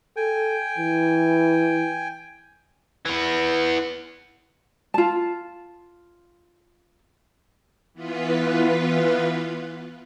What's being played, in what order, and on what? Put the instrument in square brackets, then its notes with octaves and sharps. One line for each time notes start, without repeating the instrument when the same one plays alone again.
[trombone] A4 [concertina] G5 G#5
[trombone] E3
[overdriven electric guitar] E3 B3
[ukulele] F4 A5
[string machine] E3 B3 F4 B4